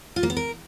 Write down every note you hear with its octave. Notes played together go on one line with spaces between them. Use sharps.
F4
A#3
B3
A#4